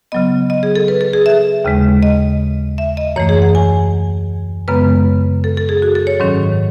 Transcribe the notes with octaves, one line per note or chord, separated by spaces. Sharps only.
C#3 F#3 B3 D#5
D#5
G#4
A4
B4
A4
G#4
E5
D#2 C#3 G#3
D#5
E5
D#5
F#2 E3 A3 C#5
G#4
F#5
G#5
F#2 C#3 G#3 B3 B4
A4
A4
G#4
F#4
A4
C#5
G#2 D#3 F#3 C#4